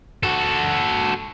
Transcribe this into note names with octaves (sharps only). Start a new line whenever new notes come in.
F#4 A4